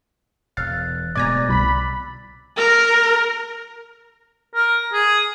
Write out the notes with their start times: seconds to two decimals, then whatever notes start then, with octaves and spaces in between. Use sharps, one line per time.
0.57 E1 F5 E6 F#6 A6
1.15 D1 B2 G#3 D5 G#5 A#5 D6 A6
1.49 C2 B5
2.57 A#4
4.55 A#4
4.93 G#4